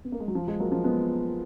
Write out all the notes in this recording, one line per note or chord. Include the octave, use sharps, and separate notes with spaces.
B3
A#3
G#3
F#3
F3
F3 G#3
F#3 A#3
F3 G#3
G#3 B3